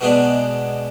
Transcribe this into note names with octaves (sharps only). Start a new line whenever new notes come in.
B2 G#3 B3 D4